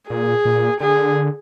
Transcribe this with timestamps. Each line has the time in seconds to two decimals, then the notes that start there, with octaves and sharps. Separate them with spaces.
0.10 A#2 G#4
0.45 A#2
0.80 D3 G#4